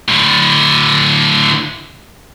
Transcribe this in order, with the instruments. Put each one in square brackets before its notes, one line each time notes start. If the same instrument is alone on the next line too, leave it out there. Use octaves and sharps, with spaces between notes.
[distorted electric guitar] A2 D3